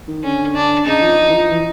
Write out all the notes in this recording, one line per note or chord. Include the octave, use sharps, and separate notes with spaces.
D#3
D3 C#4
D4
C#3 D#4
F3
E3
F3
E3